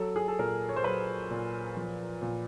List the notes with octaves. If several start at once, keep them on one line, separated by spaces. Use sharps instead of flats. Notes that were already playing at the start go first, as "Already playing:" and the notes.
Already playing: F#3 A4
G#4
A4
A#2 A#4
C#5
C5
F#3 B4
A#2
F3
A#2